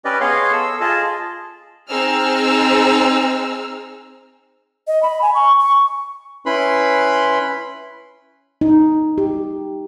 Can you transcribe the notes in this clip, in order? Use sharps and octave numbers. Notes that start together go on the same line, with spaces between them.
C#4 G4 B4 D5 D#5
B3 G#4 C#5 D#5 F5 C6
A4 E6
F4 G#4 D#5 A5
C4 D#4 G#4 E6 F6
D#5
B5
G#5
C#6
C#6
C#4 E4 B4 B5 C6
D#4
G4